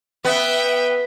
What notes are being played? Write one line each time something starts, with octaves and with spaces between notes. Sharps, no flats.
B3 E5 G5